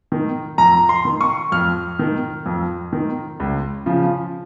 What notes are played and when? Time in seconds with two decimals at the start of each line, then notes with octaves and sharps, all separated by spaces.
0.12 D#3
0.58 F2 A#5
0.89 C6
1.05 D#3
1.21 C#6
1.52 F2 F6
1.99 D#3
2.46 F2
2.93 D#3
3.40 C#2
3.86 C#3 F3